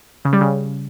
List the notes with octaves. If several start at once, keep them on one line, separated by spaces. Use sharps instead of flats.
C#3
G3
C#3